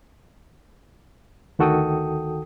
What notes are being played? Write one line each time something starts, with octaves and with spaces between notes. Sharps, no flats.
D2 D#3 F#4 A4 G5 D#6